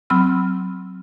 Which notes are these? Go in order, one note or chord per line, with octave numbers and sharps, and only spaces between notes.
F#3 C4 B5 E6 F6